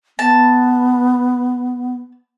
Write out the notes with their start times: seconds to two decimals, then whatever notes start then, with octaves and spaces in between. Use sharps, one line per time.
0.19 B3 A5